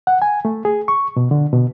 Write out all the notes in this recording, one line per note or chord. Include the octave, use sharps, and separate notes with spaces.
F#5
G#5
A3
G#4
C#6
B2
D3
B2